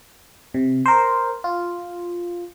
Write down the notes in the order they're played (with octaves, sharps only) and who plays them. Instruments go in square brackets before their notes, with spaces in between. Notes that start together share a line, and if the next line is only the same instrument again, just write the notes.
[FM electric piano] C3
A#4 C5
F4